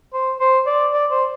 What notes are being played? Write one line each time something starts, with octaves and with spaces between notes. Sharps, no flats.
C5
C5
D5
D5
C5